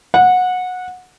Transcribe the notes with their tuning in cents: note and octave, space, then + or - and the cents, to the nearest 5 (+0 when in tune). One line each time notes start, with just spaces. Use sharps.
F#5 -20